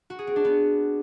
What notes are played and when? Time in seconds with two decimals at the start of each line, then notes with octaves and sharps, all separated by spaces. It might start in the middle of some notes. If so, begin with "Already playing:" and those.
0.10 F#4
0.19 G#4
0.27 C4
0.36 D4
0.45 B3